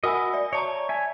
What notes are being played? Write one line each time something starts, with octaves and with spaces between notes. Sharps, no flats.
F#4 A#4 D#5 F#5 G#5 B5 E6
D5 E5
C#5 D5 A5 A#5 C#6
E5 G#5